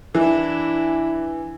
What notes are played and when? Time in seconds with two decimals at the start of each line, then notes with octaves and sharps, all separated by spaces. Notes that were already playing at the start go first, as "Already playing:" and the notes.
0.15 E3 D4 E4